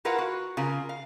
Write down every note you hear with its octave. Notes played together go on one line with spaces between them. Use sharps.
E4 F4 A#4 B4 F5 F#5
F#4
C#3 F4 A#4
F5